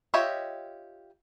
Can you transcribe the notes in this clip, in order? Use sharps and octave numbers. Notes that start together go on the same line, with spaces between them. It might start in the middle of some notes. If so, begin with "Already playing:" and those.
F4 G4 C#5 D#5 E5